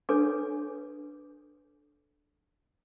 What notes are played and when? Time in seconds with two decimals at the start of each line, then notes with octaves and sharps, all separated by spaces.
0.09 D4 A4 B4 C#5 G#5 D6